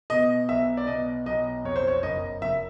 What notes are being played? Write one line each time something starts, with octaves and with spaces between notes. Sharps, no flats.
B2 D#5
B1 E5
D5
B2 D#5
B1 D#5
F2 C#5
C5
C#5
F#1 D#5
F#1 E5